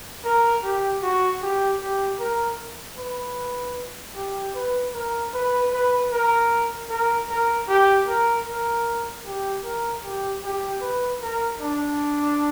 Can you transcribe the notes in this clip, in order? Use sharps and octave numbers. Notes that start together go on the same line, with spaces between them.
A#4
G4
F#4
G4
G4
A#4
B4
G4
B4
A#4
B4
B4
A#4
A#4
A#4
G4
A#4
A#4
G4
A#4
G4
G4
B4
A#4
D4